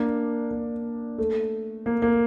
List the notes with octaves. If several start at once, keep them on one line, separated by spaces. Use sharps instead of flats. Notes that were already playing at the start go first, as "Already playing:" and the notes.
Already playing: A#3 D4
A#3
A3
A#3
A#3